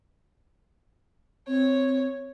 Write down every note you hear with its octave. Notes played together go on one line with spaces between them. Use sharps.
C4 C#5